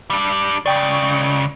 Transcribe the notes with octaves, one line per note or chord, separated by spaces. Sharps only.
G3 D4
C#2 C#3 D5 G5 C#6